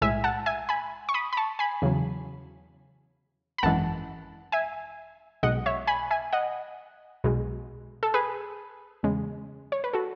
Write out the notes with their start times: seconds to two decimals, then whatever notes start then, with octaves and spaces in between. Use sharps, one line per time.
0.02 B1 A2 G#3 E5 G#5
0.24 F#5 A5
0.46 E5 G#5
0.69 G#5 B5
1.09 C#6
1.14 B5 D#6
1.33 B5
1.37 A5 C#6
1.59 G#5 B5
1.82 E2 C#3 F#3
3.58 B5
3.63 G#1 F#2 E3 G#3 F#5 A5
4.52 E5 G#5
5.43 B1 B2 G#3 D#5 F#5
5.66 C#5 E5
5.87 G#5 B5
6.11 E5 G#5
6.33 D#5 F#5
7.24 B1 B2 G#3
8.03 A4
8.14 G#4 B4
9.03 E2 C#3 G#3
9.72 C#5
9.84 B4
9.93 F#4 A4